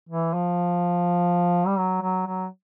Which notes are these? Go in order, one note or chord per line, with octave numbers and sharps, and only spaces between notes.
E3
F3
G3
F#3
F#3
F#3